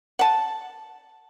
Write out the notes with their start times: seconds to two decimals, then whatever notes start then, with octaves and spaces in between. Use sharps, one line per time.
0.19 F#5 A5